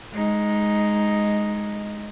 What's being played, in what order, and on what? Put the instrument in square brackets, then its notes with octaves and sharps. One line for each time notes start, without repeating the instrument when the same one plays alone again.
[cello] G#3 D#4